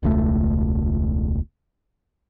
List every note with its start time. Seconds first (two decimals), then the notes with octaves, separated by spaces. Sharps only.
0.03 E1 C#2 A3